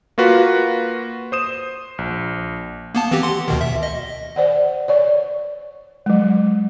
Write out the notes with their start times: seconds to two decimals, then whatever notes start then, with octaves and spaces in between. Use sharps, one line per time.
0.18 A#3 F4 F#4 B4
1.32 C5 D#6 E7
1.98 A#1
2.95 A#3 B3 A5
3.11 E3 C4 G4
3.23 F#5 C6
3.48 D2 B2 D#3
3.61 E5
3.83 D#5
4.36 C5 D5 F#5
4.88 C#5 D5 C#6
6.06 F#3 G#3